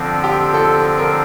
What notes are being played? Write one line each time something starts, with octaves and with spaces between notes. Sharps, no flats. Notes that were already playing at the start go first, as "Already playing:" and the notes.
Already playing: D3 F3 C4 A4
G4
A4
A#4